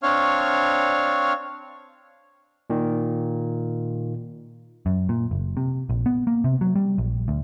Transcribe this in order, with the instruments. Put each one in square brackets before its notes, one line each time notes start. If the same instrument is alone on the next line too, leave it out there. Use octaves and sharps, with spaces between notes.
[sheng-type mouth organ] C4 D4 C#5 F5 C#6 F6
[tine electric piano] A#2 D#3
[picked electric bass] F#2
A#2
F#1
C3
A#1
B3
A#3
C3
F#3
G3
A#1
D2